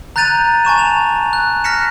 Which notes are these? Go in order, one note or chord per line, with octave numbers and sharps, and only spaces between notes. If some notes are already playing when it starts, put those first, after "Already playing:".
A#5 F#6 G6 A6 D#7 F7
G#5 A5 C#6 E7
E7 F7
F#6
F6 F#6 A#6 B6 C#7 E7